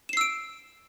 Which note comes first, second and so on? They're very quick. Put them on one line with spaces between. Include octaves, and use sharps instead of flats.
E7 C7 E6 D7